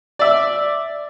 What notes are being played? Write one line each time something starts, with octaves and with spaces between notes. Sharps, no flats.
D5 E5